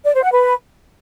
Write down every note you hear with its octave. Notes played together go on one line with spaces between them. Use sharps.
D5
C5
F#5
B4